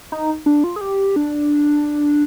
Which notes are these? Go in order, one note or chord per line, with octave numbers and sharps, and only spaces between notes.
D#4
D4
F4
G#4
G4
D4